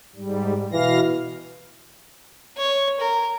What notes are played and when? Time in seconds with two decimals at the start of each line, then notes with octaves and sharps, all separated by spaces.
0.16 G#2 G3
0.72 B2 E3 F5 A#6
2.58 C#5
3.00 A#4